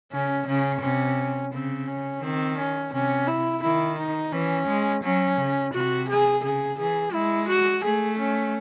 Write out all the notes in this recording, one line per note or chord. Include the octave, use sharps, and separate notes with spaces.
C#3 C#4
C#3 C#4
C3 C#4
C#3 C4
C#4
D#3 C4
C#4
C3 C#4
E4
D#3 E4
D#4
E3 C#4
G#3
F#3 C#4
C#3
C3 F#4
G#4
C#3 G#4
E3 G#4
G#3 E4
F#4
A3 G#4
C#4